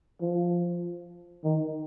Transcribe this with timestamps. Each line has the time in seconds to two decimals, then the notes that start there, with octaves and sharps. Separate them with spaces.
0.21 F3
1.44 D#3